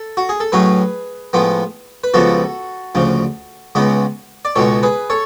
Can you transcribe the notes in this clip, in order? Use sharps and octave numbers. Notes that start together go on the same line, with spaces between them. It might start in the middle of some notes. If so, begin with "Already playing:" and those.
Already playing: A4
F#4
G#4
A4
A2 F#3 A3 C#4 G#4 B4
A2 F3 G#3 B3
B4
C#2 C#3 F3 B3 F#4 A4
D2 C#3 F3
C#2 C#3 G#3 B3
D5
C#2 B2 G#3 A4 C#5
G#4 B4
A4 C#5